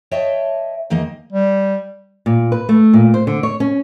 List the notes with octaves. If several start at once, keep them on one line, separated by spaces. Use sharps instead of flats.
C#5 D#5 E5 G5 A5
E2 D#3 A#3 D#5
G3
A#2
B4
A3
A#2
C5
D3
C#5
C#4